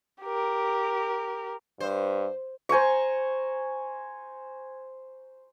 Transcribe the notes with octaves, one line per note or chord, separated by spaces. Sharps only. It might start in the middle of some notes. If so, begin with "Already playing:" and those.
G4 A#4
G2 C5
C5 G#5 A#5 C#6